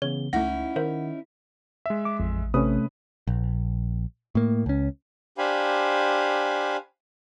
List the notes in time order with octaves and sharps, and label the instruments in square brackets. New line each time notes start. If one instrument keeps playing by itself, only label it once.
[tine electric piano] C#3 E3 B3 [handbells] C#5 [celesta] G7
[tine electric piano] C#2 [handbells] A3 A#6 [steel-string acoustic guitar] C#4 D#4 E4 [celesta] F#5
[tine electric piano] D#3 [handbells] A#4 C5 E5
[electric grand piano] G#3 E5
[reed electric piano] D6
[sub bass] A1 [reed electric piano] F2
[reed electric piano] C3 C#4 [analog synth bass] A3 [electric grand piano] B4 D#6
[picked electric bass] A#1
A2 A#3
C#2 C#4
[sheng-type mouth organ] D4 G4 C5 F5 G#5 B5